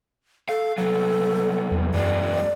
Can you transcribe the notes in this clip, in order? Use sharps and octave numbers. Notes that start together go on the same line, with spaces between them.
A4 F5
C2 F#3 A4
E2
F#2 E3 G#3 D5